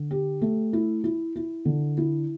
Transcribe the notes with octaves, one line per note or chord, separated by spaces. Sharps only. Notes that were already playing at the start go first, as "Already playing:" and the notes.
Already playing: D3
G4
A3
E4
E4
E4
D3
E4